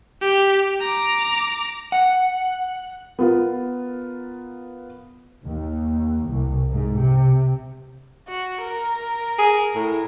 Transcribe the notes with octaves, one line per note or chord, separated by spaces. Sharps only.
G4
A#5 D6
F#5
B3 F4 A#4
D#2
C2
G#2
C3
F#4
A#4
G#4
A2